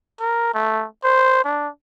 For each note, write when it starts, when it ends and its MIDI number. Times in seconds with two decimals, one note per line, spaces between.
0.20 0.51 70
0.54 0.85 57
1.04 1.44 72
1.45 1.68 62